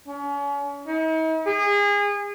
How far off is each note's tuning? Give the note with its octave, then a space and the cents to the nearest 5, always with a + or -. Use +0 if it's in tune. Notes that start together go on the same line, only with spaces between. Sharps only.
C#4 +35
D#4 +45
G#4 -30